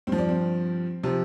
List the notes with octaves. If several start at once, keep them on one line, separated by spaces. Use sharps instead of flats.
G2 C4
F3
D4
C4
C3 F3